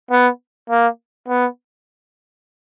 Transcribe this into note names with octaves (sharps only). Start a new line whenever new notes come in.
B3
A#3
B3